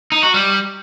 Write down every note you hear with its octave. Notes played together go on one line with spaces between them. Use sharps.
D#4
F#4
G3